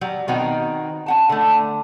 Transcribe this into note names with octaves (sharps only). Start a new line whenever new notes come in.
F#3 G3 A#5
B2 D#3 C4 D#4 F#4 A#5
C#4 F#5 A5
D3 A3